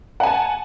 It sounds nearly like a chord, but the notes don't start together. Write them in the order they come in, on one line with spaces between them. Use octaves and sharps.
F#5 G#5 A5